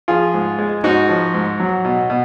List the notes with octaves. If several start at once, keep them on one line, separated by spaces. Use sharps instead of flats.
F3 F4 G#4
G#2
G#3
G#2 D#4 F#4
F3
G#2
F#3
B2
B2